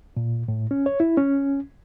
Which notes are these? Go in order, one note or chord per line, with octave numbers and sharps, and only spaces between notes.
A#2
A2
C#4
C#5
E4
C#4